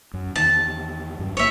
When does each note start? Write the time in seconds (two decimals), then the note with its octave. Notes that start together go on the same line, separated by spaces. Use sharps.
0.14 F#2
0.36 E2 D#3 A5
1.19 G2 F#3
1.37 G1 A#3 C#5 E5